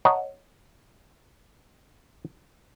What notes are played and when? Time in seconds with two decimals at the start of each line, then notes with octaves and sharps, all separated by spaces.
0.05 C#5 D#5 F#5 A5 A#5